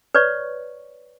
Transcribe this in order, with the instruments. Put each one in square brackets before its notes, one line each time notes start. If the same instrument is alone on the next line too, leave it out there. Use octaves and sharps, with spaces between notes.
[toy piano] B4 C#5 D5 C#6